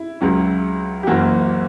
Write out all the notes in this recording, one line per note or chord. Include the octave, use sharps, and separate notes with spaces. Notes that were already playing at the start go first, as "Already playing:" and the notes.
Already playing: E4
C#2 C#3 F#3 C#4
G4
F#1 F#2 E3 A#3 F#4